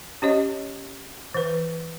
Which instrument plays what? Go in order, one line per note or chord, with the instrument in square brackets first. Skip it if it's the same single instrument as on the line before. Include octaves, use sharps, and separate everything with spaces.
[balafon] C#4 G4 C#5 D#5
E3 B4